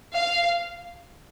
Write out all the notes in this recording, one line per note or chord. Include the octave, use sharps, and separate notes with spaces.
F5